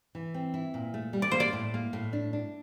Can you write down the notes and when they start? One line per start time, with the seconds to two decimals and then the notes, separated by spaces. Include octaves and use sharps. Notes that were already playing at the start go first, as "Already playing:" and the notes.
Already playing: F4
0.15 E3
0.34 C4
0.54 E4
0.74 A#2
0.94 A3
1.13 G3
1.22 D5
1.31 A#3 C5
1.40 D5
1.53 A2
1.74 A#3
1.93 A2
2.13 D4
2.33 D4